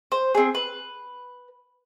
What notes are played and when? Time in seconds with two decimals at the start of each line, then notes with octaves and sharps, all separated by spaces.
0.12 C5
0.35 C4 G#4
0.55 B4